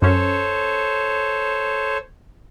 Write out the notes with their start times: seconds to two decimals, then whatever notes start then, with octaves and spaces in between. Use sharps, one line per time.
0.02 F#2 C#4 A4 C5 C#5